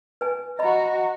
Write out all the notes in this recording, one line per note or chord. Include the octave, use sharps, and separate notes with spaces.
B4 G#5
F#4 D#5 A#5 B5